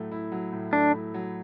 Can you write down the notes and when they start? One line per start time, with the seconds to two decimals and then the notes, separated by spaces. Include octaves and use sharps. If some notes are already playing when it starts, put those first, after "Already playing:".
Already playing: A2 F#3 A3
0.11 E4
0.32 F#3
0.53 A2
0.73 A3 D4
0.93 E4
1.14 F#3